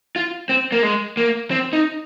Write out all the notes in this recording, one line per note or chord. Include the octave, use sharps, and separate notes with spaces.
F4
C4
A#3
G#3
A#3
C4
D#4